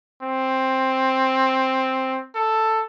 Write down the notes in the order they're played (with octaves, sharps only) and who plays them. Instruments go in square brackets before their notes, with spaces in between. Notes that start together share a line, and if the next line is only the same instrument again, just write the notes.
[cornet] C4
A4